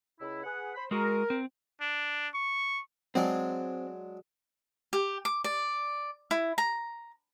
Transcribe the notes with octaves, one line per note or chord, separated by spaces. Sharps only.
C#2 E4
G#4 B4 F#5
C5 B5
G#3 F#4 G#4 A#4
C4
D4
C#6
F#3 G#3 C4 D4
G4
D6
D5
E4
A#5